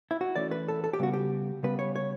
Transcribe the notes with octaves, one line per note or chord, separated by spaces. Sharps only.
E4
F#4
E3 A3 C#4 D5
B4
A4
A4
G4
C#3 G3 B3 F#4
G4
C#3 G3 B3 B4
C#5
C#5